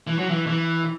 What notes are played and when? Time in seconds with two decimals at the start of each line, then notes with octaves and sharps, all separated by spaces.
0.07 E3
0.18 F#3
0.29 E3
0.47 E3